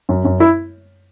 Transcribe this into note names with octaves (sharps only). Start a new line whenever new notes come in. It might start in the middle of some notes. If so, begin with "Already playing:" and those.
F#2
F#2
E4